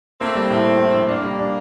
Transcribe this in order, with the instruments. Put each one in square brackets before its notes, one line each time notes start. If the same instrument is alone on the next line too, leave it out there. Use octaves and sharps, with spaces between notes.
[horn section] A3 C4 [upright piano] A#3
[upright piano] G3
A2
A2
A2
A#1
[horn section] A#3 [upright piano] D4
[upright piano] G3
D4